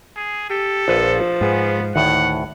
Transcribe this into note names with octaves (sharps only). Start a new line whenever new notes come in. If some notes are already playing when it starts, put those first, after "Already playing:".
G#4
G4 A4
A#1 F3 B4 F#5
G#2 B3 G#4 B4 F#5
D2 A2 D#3 F#5